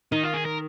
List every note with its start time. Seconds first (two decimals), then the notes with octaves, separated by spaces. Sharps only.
0.12 D#3 D#4
0.24 F4
0.34 G#4
0.46 A#4